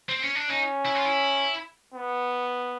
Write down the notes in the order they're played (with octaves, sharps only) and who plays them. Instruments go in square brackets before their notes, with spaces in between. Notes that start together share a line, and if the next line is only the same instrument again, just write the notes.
[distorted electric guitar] C4
C#4
D4
[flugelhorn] C#4 [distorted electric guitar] D#4
[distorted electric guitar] E4
F4
E4
[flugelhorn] B3